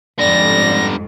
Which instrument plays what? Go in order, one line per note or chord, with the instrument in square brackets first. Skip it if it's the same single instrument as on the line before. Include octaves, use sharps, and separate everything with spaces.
[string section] F2 G#2 [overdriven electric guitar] D3 G3 [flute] D5 [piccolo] A#6